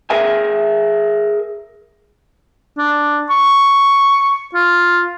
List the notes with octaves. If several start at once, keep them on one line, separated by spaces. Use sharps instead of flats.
G#4 A#4 E5 G#5
D4
C#6
F4